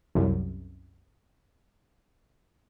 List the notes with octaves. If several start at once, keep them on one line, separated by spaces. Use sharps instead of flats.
C2 F#2